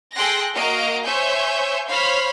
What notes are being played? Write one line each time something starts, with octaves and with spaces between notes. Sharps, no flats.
G#4 A4 G5 C6 F#6 A#6
A#3 F#4 D#5 F5 A#5 D7
C5 C#5 E5 G#5 C#6 G6
C5 C#5 F5 B5 F6 B6